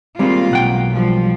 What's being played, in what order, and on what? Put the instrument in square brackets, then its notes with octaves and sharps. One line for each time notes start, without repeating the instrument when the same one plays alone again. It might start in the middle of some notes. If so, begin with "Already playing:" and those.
[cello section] D#3 A#3 F4 [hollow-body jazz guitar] G3 G#3 C4
[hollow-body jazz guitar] B1 F#5 G5
[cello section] F3 G3